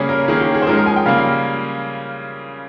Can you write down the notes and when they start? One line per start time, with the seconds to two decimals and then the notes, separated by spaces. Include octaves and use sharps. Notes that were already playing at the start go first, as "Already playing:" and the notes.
Already playing: C#3 G3 A#3 C#4 G#4
0.09 A#4
0.28 D#3 A#3 C#4 G#4
0.41 G4
0.54 G#4
0.62 C5
0.67 F3 G#3 C#4 A#4
0.77 A#4
0.86 G#5
0.96 G5
1.06 C#3 G3 A#3 F5
1.19 F5